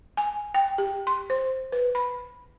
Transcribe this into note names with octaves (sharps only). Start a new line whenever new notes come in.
G#5
G5
G4
C6
C5
B4
B5